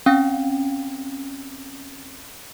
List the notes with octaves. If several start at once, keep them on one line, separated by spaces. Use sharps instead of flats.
C4 C#4 F5 G5